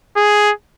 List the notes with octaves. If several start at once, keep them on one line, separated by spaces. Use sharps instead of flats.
G#4